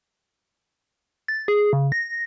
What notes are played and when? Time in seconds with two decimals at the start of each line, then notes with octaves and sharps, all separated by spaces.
1.28 A6
1.48 G#4
1.73 C#3
1.92 A#6